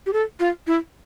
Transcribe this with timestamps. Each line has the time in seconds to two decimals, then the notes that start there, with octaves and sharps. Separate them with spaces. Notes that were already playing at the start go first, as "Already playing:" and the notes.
0.06 G4
0.13 A4
0.40 F4
0.67 E4